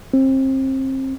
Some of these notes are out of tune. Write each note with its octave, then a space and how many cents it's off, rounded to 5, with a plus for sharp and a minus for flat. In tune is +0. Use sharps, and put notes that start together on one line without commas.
C4 +30